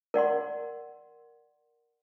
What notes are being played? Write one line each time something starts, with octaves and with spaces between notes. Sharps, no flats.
A#4 D5 F#5 C6